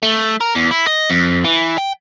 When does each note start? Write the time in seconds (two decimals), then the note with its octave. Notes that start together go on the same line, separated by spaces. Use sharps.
0.03 A3
0.40 A#4
0.55 E2
0.71 E4
0.87 D#5
1.10 F2
1.44 E3
1.78 G5